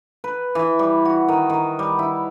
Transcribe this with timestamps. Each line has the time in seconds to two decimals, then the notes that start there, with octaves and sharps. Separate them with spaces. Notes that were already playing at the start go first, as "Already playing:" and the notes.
0.24 B4
0.55 E3
0.79 G3
1.05 F#4
1.28 D#3
1.50 D#3
1.79 G3
1.99 E4